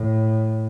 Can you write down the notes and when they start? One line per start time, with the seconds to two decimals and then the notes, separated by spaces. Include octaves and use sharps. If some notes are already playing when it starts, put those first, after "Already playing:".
Already playing: A2